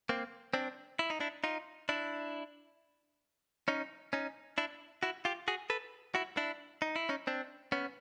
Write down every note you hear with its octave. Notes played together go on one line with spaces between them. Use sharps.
A#3 C4
C4 D4
E4
D#4
D4 E4
D#4 F4
D4 E4
C#4 D#4
C#4 D#4
D4 E4
E4 F#4
F4 G4
F#4 G#4
A4 B4
E4 F#4
D4 E4
D#4
E4
C#4 D#4
C4 D4
B3 C#4